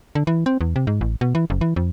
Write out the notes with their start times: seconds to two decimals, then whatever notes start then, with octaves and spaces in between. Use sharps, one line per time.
0.15 D3
0.27 E3
0.46 C4
0.61 E2
0.76 C3
0.87 G#2
1.01 A1
1.21 B2
1.35 E3
1.50 F#1
1.61 E3
1.76 F2